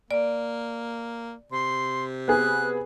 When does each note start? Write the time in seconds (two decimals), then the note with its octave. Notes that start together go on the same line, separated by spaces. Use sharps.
0.11 A#3 D5
1.52 C3 C6
2.28 B3 G#4 F#6